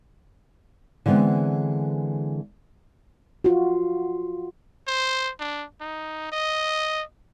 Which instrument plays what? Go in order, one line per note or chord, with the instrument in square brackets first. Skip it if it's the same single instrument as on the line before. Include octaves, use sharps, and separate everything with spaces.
[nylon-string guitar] D3 E3 G#3 B3 C4
[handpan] F4 F#4
[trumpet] C5
D4
D#4
D#5